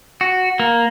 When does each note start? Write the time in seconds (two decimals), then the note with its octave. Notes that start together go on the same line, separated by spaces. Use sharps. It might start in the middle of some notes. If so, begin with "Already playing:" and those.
0.21 F#4
0.60 A#3